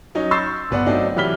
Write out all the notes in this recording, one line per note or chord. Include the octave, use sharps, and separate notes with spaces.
F#3 C#4 D#4
C6 C#6 E6 G6 A6 C7
G1 B3 D5 F#5
F#3 A3 C4 D4 D#4
C3 E3 F#3 F6 B6 G7